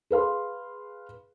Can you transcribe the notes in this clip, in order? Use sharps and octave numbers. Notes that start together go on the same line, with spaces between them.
G#4 B4 F5 C6